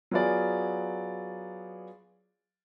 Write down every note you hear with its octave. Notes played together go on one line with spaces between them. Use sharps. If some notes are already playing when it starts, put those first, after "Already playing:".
F#3 B3 F4 G#4 D5